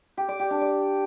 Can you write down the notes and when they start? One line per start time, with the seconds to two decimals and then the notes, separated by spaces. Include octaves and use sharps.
0.17 G4
0.28 D5
0.39 G4
0.50 D4
0.61 D5